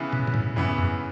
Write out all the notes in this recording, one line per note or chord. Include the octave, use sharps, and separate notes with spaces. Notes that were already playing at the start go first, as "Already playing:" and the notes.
Already playing: C#3 E3 B3 E4
B2
B2
A2
G2 C#3 E3 B3 E4
F#2